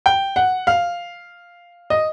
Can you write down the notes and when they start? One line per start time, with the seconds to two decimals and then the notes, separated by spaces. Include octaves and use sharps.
0.06 G5
0.36 F#5
0.67 F5
1.90 D#5